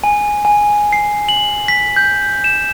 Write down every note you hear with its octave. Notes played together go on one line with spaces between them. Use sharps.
G#5
G#5
C7
F#7
B6
G6
E7